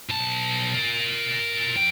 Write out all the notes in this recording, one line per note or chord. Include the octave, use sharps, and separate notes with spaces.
B1 A5
A#4 D5
F2 G5